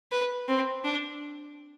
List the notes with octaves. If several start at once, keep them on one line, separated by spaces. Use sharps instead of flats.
B4
C4
D4